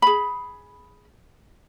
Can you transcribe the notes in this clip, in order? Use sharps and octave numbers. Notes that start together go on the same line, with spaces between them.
G#4 B5